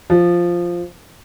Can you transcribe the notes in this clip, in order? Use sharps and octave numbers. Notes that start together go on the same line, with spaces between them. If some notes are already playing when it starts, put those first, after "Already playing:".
F3